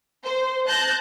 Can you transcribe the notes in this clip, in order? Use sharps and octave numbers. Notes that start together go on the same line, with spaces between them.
C5
A5 F#6 G6 A#6